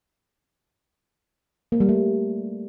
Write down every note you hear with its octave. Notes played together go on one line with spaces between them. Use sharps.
A#3
G3
A3